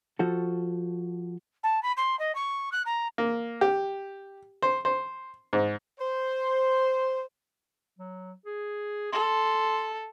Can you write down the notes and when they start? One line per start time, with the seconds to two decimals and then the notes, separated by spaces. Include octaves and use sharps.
0.19 F3 F#4 A4
1.63 A5
1.82 B5
1.97 C6
2.19 D#5
2.35 C#6
2.72 F#6
2.85 A#5
3.18 A#3
3.61 G4
4.62 C5
4.85 C5
5.53 G#2
5.99 C5
7.99 F#3
8.46 G#4
9.13 A4 C6